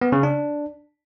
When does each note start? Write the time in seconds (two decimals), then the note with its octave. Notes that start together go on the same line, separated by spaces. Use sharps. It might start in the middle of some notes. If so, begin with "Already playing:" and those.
0.01 B3
0.12 C#3
0.23 D4